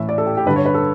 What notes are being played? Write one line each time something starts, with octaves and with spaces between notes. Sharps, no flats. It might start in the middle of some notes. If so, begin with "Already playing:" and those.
Already playing: A2 E3 E5
D5
A4
G4
G4
G2 D3 B4
C#5
B4
A4